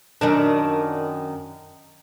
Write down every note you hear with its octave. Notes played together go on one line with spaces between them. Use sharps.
F#2 D#3 D4